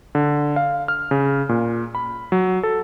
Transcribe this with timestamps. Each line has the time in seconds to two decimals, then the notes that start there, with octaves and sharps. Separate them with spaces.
0.15 D3
0.56 F5
0.88 F6
1.11 C#3
1.49 A#2
1.95 B5
2.32 F#3
2.63 A4